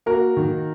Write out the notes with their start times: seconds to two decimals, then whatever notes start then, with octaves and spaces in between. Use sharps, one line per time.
0.06 A#3 F#4 A#4
0.37 D#3